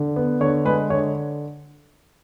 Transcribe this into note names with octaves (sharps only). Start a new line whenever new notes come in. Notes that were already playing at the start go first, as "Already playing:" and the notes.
Already playing: D3
B3
D3 C#5
G#3 B4
D3 C#5